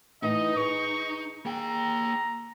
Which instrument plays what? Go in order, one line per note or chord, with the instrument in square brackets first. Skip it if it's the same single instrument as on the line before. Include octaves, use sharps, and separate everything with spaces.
[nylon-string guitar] A2 E3 [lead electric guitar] D#4 [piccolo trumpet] D#5
[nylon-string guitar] G#4 B4 [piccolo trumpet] C#6
[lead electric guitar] A#3 G5 [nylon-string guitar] G#4 [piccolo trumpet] A#5